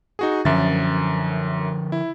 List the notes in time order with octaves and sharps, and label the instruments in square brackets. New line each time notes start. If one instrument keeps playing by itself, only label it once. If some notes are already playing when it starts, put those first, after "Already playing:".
[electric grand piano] D#4 F#4 G#4
[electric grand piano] F#2 E5 A6 [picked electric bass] D3 F3
[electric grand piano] E4